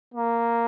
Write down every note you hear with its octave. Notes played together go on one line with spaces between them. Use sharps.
A#3